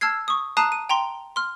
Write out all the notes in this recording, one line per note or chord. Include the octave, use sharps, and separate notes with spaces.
A5 E6 F6 G#6 C7
C#6 D#6
A5 A#5 D#6 F#6 C7 D#7
D#7
G5 A#5 C6
C6 F6